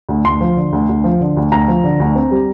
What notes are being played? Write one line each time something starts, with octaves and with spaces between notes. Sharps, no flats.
D2
D2 C6
F3
D3
D2
D2
F3
D3
D2
D2 A#5
F3
D3
D2
C4
G3